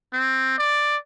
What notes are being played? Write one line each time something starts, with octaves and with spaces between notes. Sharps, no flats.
C4
D5